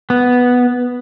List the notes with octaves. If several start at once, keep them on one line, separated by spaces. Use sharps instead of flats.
B3